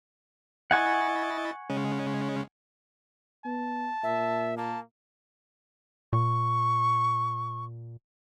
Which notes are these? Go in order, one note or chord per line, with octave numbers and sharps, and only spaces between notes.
E4 D#5 F#5 G#5 C#6 A6
C#3 G#3 C#4
B3 A5
A#2 E5
A#3 A5
A#2 C#6